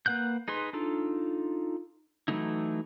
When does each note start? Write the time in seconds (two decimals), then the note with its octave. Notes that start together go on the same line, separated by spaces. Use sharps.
0.06 A#3 B4 F#5 F#6 G6
0.48 D#4 G#4 B4 C6
0.73 D4 D#4 F4 A4
2.28 E3 F#3 A3 D#4 E4